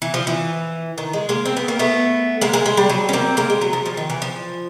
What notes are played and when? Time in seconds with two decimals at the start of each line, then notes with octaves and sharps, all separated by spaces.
0.02 E3
0.14 F3
0.27 E3
0.98 D#3
1.13 G#3
1.29 G#3 A#3
1.46 C4
1.57 B3
1.68 A#3
1.79 A3 B3
2.41 G#3 A#3
2.53 G#3 A#3
2.66 G#3
2.77 G3
2.89 F#3
3.09 C#4
3.13 A#3 C4
3.37 G#3 A#3
3.50 G#3
3.61 F#3
3.73 F3
3.86 F3
3.97 D#3
4.10 E3
4.22 F3